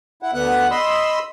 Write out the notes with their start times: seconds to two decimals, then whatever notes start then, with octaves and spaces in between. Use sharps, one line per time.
0.23 E4 F#5
0.34 D2 D3 B3 F#5 F#6
0.71 D#5 B5 C6 E6